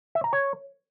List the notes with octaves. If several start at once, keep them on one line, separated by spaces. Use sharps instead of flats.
E5
A#5
C#5